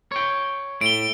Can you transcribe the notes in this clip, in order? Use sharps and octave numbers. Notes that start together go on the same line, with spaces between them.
C#5 G5
A2 D7 G7